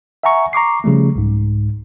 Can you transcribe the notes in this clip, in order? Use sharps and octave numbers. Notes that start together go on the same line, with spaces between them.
E5 F#5 G#5 A#5 C#6
A#5 C#6 D6 C7
C#3 F3 G3 A3
C2 G#2